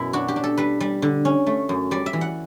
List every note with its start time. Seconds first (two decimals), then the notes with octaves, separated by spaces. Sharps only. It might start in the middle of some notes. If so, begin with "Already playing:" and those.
Already playing: F#2 B2 E4
0.13 D4 F#4
0.28 G4
0.36 D4
0.44 A4
0.58 G3 B4
0.80 G3
1.02 D3
1.25 C#4
1.47 A3
1.69 F#2
1.91 G3 D5
2.06 E5
2.13 E3
2.21 F#5